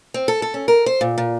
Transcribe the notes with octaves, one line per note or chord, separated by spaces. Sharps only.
C4
A4
A4
C#4
A#4
C5
A#2
A#2